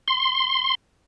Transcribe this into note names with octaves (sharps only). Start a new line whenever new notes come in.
C6